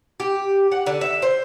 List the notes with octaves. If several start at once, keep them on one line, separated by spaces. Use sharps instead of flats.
G4
F#5
D3
E5
C5